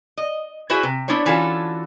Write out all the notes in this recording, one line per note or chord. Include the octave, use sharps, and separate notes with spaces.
D#5
E4 F#4 G#4 B4 C5 E5
C3
B3 D4 E4 C5 C#5
D3 E3 C#4 F4 F#4 A4